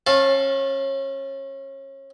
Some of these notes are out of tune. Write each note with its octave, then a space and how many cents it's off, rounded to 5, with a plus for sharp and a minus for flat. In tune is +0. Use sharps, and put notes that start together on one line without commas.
C#4 -30 F5 +0 A5 +0